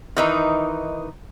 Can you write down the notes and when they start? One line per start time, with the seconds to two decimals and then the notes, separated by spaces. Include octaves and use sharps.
0.17 D#3 E3 D#4